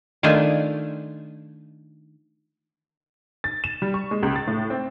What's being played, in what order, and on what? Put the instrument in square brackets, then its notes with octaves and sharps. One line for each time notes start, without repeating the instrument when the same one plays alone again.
[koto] D#3 A3 D4 F4 G5 G#5
[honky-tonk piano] A6
E7
G3
C#6
G#3
C#2
A6
A2
C4